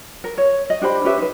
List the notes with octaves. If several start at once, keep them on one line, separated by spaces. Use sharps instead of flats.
A#4
C#5
D#5
D4 G4 C5 B5
C#4 G4 B4 E5
D#4 B4